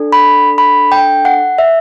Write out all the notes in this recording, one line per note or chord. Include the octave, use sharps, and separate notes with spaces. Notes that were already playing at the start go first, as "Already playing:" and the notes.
Already playing: D4 A4
B5
B5
G5
F#5
E5